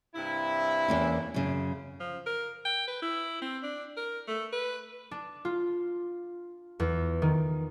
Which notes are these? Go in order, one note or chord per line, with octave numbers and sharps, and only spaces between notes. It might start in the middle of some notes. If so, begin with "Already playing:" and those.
G2 C3 E4
E2 A#3 C#4
F#2 C#3
F3
A#4
G5
B4
E4
C4
D4
A#4
A3
B4
D4
F4
E2
D#3